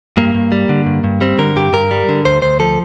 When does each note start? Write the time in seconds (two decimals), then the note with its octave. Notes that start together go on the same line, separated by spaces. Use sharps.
0.17 G2 A#3
0.34 G2
0.52 G3
0.69 D3
0.86 G2
1.04 G2
1.21 G3 C4
1.39 D3 A#4
1.56 G2 G4
1.73 G2 A#4
1.91 G3
2.09 D3
2.25 D2 C5
2.42 D2 C5
2.60 F3 A4